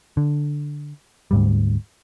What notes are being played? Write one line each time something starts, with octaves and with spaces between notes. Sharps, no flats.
D3
D2 G#2 G3